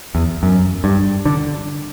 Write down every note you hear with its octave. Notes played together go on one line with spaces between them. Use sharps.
E2
F#2
G2
D3